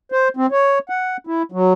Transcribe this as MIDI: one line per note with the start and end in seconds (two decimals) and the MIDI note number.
0.12 0.28 72
0.37 0.46 60
0.51 0.79 73
0.89 1.17 78
1.27 1.42 64
1.52 1.73 54